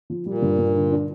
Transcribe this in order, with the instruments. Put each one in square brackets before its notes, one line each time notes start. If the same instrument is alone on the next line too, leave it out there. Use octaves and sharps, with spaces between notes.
[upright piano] F3
[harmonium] A#2 [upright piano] G3
[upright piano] G2
G2
D3
D4